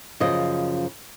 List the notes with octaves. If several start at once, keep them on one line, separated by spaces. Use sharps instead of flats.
F#2 C#3 F3 D#5